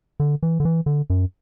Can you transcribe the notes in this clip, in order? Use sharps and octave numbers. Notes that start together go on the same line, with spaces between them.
D3
E3
D3
E3
D3
F#2